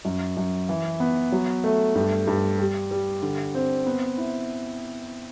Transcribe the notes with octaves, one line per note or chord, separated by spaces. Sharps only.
F#2
F#2
E3
B3
F#3
A3
G2
G2
G3
G3
D3
C4
B3
E4